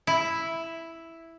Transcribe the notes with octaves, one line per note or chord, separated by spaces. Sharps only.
E4